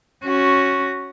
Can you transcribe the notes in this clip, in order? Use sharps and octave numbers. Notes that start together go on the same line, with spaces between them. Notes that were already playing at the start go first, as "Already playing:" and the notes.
C#4 F#4